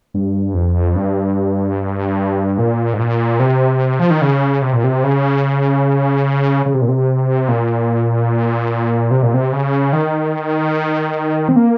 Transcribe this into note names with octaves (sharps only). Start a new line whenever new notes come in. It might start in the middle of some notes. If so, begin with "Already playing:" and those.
G2
F2
G2
A#2
G#2
A#2
C3
F3
D#3
C#3
C3
A#2
C3
C#3
C#3
C3
A#2
C3
A#2
C3
A#2
C3
C#3
D#3
C4
A#3